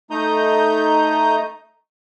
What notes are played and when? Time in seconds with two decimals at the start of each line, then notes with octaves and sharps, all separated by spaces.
0.10 A3 D#4 A#5 D#6 G6